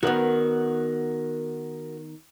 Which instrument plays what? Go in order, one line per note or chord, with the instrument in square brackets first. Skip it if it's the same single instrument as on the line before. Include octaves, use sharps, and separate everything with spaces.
[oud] D#3 B3 [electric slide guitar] F#4 A#4 F#5